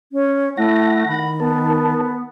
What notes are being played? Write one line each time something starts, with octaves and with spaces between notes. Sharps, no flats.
C#4
A3 E4 F#5 A#6
D#3 B5
B3 A#4 A5